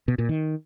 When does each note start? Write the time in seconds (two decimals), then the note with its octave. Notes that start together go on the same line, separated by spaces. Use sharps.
0.08 B2
0.18 A#2
0.29 D#3